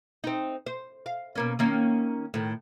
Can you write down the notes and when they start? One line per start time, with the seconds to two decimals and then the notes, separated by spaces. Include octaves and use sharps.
0.24 C4 D#4
0.66 C5
1.06 F5
1.35 B2 A#3 C#4
1.59 D#3 A#3 C#4
2.34 A2 D#3